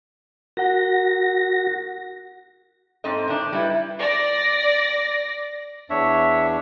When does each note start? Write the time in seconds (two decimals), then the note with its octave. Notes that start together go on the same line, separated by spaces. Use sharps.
0.57 F#4 A#4 F#5 A#6
3.04 G#2 C4 A4 D#5
3.28 A2 D#3 D4
3.52 G3 E4 B4
3.99 D5 A#6
5.90 E2 D4 C#5 E5